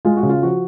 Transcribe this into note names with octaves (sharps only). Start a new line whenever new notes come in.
G#3 F4
F#4
C#3
F4
F3 F#4